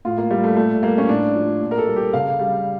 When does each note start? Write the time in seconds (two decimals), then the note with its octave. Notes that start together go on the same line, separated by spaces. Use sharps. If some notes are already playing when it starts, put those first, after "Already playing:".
0.05 A2 F4
0.18 A#3
0.30 G3
0.44 A3
0.56 A#2 A3
0.83 G3 A#3
0.98 C#4
1.09 A2 D4
1.35 F3
1.61 A#2
1.71 A#4
1.78 A4
1.87 G3
1.96 G4
2.13 C#3 F5
2.39 G3